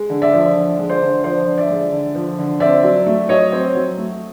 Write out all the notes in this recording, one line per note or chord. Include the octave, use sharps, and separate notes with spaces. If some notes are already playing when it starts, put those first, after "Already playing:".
Already playing: G#3
D3
D5 E5
F3
D3
G#3
C5 D5
D3
F3 C5 D5
D3
D5 E5
G#3
D3
F3
D3
C4 D5 E5
F#3
A3
F#3 C#5 D#5
C4
F#3
A3